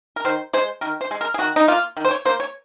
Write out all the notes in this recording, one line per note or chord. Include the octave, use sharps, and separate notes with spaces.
A#4
D#3 C5
G#3 C5
D#3 A#4
C5
G#3
A#4
G#4
D#3 F#4
D#4
A#3 F4
D#3
C5
C#5
A#3 C5
C#5